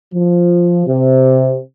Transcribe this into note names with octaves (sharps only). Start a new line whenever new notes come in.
F3
C3